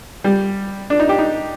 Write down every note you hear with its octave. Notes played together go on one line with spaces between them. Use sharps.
G3
D4
D#4
G4
D#4